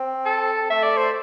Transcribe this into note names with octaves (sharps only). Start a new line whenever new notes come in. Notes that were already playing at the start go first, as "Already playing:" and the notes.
Already playing: C4
A4
A3 E5
D5
C5